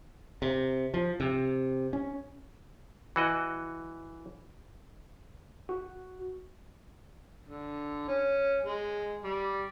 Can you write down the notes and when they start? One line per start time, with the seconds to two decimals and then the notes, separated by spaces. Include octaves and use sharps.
0.42 C3
0.94 F3
1.20 C3
1.93 C#4
3.16 E3 F#4 D#5
5.69 F#4
7.46 D3
8.08 C#4
8.63 G#3
9.24 G3